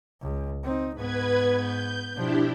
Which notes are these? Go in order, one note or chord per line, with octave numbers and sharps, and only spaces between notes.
C#2
C4 D#4
G#2 B3 B4 G#6
G6
B2 F3 D4 E4 G4